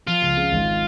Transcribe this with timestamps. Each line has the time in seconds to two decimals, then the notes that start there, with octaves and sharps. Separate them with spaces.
0.07 F3 F4
0.22 C#2
0.37 C#3
0.52 G#1